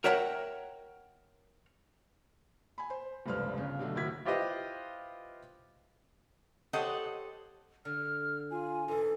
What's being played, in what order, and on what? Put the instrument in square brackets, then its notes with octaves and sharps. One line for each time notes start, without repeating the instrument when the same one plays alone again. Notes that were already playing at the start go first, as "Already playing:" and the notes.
[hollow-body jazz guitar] A#4 C#5 E5 F#5 G5 A#5
[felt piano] G#5 B5
C5
F1 C#2 G2 B4 C5 F6
G1 C#3
B2 D3 F#3 A3
F#1 A2 D#3 F#4 G#6 B6
[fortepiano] E4 F4 G4 B4 C5 D#5
[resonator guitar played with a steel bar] G4 A4 C5 C#5 D#5 F#5
[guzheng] D3 [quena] F6
[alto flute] F4 [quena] G#5
[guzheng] G#2 E3 [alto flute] A4